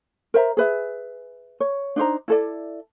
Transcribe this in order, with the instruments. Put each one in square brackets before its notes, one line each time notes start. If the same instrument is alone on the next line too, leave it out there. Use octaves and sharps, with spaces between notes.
[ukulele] A#4 C5 E5 A#5
G#4 B4 E5
C#5
D4 D#4 C5 A#5
E4 A4 D5